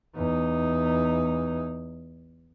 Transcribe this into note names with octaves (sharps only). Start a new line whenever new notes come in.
E2 D#4